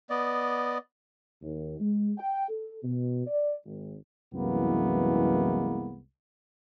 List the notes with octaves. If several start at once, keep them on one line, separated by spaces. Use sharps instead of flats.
B3 D5 D#5
D#2
G#3
G5
A4
B2
D5
G#1
C2 F#2 E3 G#3 A#3 B3